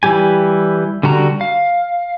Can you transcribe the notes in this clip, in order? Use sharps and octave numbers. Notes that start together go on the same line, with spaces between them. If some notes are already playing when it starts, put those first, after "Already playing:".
E3 G3 G4 G#5
D3 G3 F#4 A#5
F5